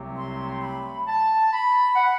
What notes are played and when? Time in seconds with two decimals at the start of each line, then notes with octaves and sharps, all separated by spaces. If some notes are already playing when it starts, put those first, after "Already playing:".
Already playing: C2 C3 F#3 A3 C4
0.18 C6
0.62 B5
1.07 A5
1.52 B5
1.96 F#5